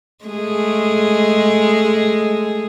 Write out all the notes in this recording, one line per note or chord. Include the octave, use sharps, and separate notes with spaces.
G#3 A3 G#4